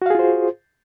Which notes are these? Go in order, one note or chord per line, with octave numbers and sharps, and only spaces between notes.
F4 F#4 G#4 C5 F5